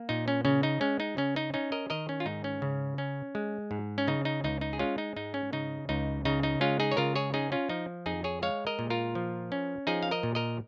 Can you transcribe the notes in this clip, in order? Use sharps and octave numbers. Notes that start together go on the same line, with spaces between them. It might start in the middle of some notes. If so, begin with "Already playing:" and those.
Already playing: A#3
A#2 D#4
C#4
C#3 C#4
D#4
G#3 C#4
D#4
C#3 C#4
D#4
C#4 D#4
A#4 D#5
D#3 A#4 D#5
C#4
F4
G#2 D#4
C#4
C#3
C#4
G#3
G#2
C#4
C#3 D#4
D#4
C#2 D#4
D#4
G#4
G#3 C#4 F4
D#4
G#2 D#4
C#4
C#3 D#4
C#2 D#4
C#3 D#4
D#4
G#3 C#4 F4
D#4 G#4
C#5
C#3 F4 A#4
G#4 C#5
C#4 D#4 G#4
C#4 F4
F3 D#4
F2 D#4 G#4
G#4 C#5
G#3 C#5 F5
A#4 D#5
A#2
F4 A#4
F3
C#4
F3 D#4 G#4
F5
A#4 D#5
A#2
A#4 D#5